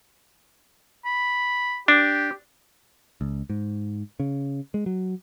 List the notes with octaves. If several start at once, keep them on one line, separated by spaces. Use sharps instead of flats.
B5
D4 G4
C#2
G#2
C#3
G#3
F#3